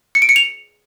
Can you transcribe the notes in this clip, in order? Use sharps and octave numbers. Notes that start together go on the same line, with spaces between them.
C#7
D7
C#7
F7